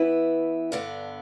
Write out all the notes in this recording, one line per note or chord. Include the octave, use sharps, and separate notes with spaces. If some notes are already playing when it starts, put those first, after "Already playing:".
Already playing: E3 B3 E4 B4
G2 D3 B3